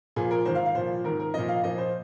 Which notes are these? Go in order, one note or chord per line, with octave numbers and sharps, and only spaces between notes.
A#2 F3 G#4
A#4
G#2 D#3 C5
F5
F5
A#2 F3 C5
G#2 D#3 A#4
A#4
A#2 F3 D#5
F5
A#2 F3 D#5
C5